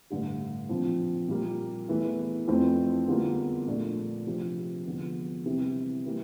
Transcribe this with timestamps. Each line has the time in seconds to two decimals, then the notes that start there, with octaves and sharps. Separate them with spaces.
0.10 A1 G2 D3 G3
0.69 A#2 F3 C4
1.28 A#2 G3 A#3
1.88 E2 E3 A3
2.48 F2 E3 A3 C4
3.08 E2 D3 G3 A#3 F4
3.68 A#1 A#2 A3 D4
4.27 C3 F3 C4 G4
4.86 E1 E2 D3 F3
5.46 C3 E3 G3 C4
6.06 E3 G3 A#3